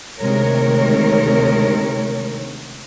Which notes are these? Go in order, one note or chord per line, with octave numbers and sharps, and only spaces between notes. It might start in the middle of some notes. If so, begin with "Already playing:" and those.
D2 C3 D#3 G#3 A#4 C#5